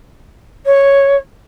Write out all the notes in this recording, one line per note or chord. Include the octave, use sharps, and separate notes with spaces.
C#5